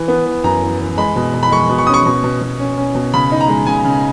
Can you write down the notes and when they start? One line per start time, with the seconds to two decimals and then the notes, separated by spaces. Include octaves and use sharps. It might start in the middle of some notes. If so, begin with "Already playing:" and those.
Already playing: E3
0.08 B3
0.26 E3
0.44 F#2 A#5
0.62 E3
0.81 E3
0.98 G#3 B5
1.16 B2
1.34 B2
1.43 B5
1.51 G#3 C#6
1.70 B2
1.78 C#6
1.87 C#4 D#6
1.94 C#6
2.06 B2
2.24 B2
2.41 B2
2.60 C#4
2.78 C#4
2.95 B2
3.13 C#3 B5
3.32 D#4
3.41 A#5
3.49 G#3
3.67 C#3 G#5
3.84 C#3